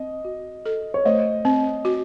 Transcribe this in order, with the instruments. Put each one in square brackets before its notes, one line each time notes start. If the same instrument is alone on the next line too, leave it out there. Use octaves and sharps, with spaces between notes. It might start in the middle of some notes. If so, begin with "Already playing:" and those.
Already playing: [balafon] C4 [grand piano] D#5
[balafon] F#4
A4
[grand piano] C#5
[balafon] A3 [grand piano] C5 D#5
[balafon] C4
F#4